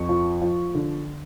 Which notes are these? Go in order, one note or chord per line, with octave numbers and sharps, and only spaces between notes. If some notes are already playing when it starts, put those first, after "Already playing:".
Already playing: F2 C#6
F3
F3
D3